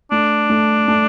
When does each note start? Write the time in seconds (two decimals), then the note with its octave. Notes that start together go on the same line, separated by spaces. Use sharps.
0.12 A3 D4
0.50 A3
0.88 A3